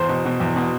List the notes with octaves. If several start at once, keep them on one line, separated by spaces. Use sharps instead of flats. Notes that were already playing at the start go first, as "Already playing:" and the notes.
Already playing: E2 C5
B2
B2
E2
B2